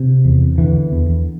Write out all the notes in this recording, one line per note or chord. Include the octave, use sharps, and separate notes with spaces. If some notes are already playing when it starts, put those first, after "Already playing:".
Already playing: C3
E2
D3 E3
E2